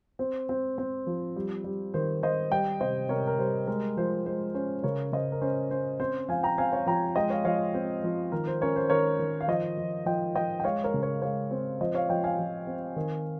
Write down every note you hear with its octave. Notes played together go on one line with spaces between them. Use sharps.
C4 C5
C4
C4
F3
G3
G3
D#3 C5
D#3 C5 D#5
G3 D#5 G5
C3 C5 D#5
C3 A#4 C#5
A#4
G3 C5
G#3 A#4
F3 C5
G#3 C5
C#4 C5
C#3 A#4 C#5
C#3 C5 D#5
A#4
C#4 C5
C#4 C5
C4 C5
F3 F5 G#5
G5 A#5
C4 F5 G#5
C#5 F5
F3 G5 A#5
G#3 D#5 G5
C#5 F5
F3 C#5 F5
C4 C5
F3
D#3 A#4
C5
C#4 A#4 C#5
C5
D#3 A#4 C#5
D#3
F5
F3 C5 D#5
F3
F3 D#5 G5
F3 D#5 G5
G5
G#3 C#5 F5
A#4 C#5
C#3
A#4 C#5
G#3 C#5 F5
C4
F3 C5 D#5
C#5 F5
F3 D#5 G5
F5 G#5
F3
C4
D#3